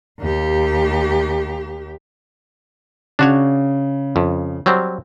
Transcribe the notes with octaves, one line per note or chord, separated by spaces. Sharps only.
D#2 G4
C#3 D4 F#4 C#5
F2
F#3 G3 C4